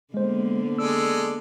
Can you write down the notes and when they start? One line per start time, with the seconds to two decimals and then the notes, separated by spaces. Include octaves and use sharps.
0.14 D3 G#3 A#3 B3 C5
0.78 G#3 A4 D5 E6